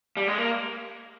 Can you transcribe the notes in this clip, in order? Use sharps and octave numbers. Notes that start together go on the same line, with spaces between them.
G3
G#3
A#3